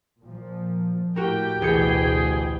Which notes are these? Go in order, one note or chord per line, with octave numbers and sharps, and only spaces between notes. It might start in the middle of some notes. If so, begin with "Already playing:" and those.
A#2 F3
A2 F#4 G4 A#4 G5
A1 D2 B2 G#4 C#7